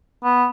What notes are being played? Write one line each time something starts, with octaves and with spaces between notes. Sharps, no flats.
B3